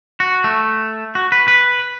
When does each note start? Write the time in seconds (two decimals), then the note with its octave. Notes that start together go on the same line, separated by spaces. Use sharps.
0.20 F#4
0.44 A3
1.15 F#4
1.32 B4
1.48 B4